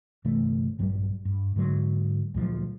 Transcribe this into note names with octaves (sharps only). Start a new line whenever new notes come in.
G1 C3 E3 A3
A#1 G2 F#3 G3
G2
G#2 D3 F#3
D2 A#2 F3 F#3